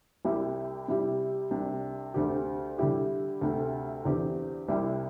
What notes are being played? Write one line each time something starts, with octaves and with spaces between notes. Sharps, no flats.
C2 C3 G3 E4 G4
C3 G3 E4 G4
C2 C3 G3 D4
D2 D3 C4 G4
D3 G3 E4 G4
D2 C3 A3
E2 D3 C4 G4
C2 C3 G3 E4 G4